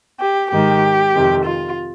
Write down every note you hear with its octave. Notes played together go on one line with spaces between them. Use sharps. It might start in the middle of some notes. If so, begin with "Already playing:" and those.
G4
G#2 D#3 G4
F2 C3 D#3
F4